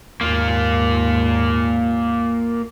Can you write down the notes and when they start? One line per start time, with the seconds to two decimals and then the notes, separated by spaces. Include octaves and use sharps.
0.21 D#2 G#2 A#3 F4